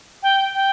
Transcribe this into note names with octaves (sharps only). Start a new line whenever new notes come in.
G5
G5